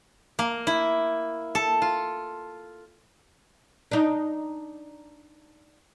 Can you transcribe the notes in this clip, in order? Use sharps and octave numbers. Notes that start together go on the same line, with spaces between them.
A#3
E4
A4
F4
D4 D#4